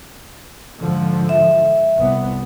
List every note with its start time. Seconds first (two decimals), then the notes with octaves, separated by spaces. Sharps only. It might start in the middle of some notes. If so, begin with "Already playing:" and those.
0.81 G#2 D3 F3
1.29 E5
1.97 C2 B3